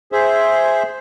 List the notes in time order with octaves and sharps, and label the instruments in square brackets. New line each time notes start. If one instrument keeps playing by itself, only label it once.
[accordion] G#4 C5 E5